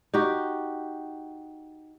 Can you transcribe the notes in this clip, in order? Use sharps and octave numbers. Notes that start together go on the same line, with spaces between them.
D#4 F#4 G4